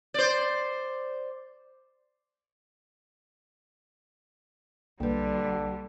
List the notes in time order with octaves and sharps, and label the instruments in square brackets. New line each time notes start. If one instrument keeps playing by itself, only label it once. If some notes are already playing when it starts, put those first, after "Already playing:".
[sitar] C5 D5
[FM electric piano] B1 [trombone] D3 [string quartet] G3 [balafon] A#3 B4